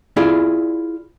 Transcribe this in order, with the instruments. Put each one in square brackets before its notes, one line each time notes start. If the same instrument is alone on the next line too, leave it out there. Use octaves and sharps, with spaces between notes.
[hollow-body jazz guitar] E4 F4 G#4 D5